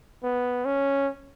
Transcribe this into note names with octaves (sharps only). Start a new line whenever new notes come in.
B3
C#4